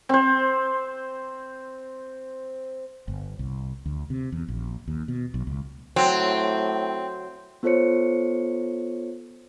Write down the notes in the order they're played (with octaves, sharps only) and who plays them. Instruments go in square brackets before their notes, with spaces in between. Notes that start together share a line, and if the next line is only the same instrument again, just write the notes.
[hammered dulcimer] C4 C5
[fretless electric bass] G1
C2
D2
C3
E2
A#1
D#2
B2
B1
C#2
[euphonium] A2 [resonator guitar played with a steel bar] F#3 [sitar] C4
[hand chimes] B3 F4 A4 C5 C#5 C#7